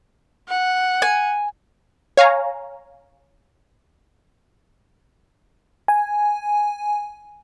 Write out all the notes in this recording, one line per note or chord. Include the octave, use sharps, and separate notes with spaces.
F#5
G#5
C#5 F5 G#5 A#5
G#5